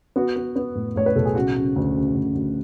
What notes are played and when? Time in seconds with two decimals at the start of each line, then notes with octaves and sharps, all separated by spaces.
0.16 B3 F#4
0.36 B3
0.56 B3
0.75 A2
0.96 A2 C#5
1.06 B4
1.16 B1 A4
1.25 G#4
1.35 C#3 F#4
1.56 C#3
1.76 D2
1.96 C#3
2.15 D2
2.35 D2